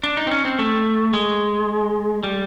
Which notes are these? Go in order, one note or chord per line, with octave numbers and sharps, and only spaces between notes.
D4
D#4
C4
C#4
C4
A3
G#3
G3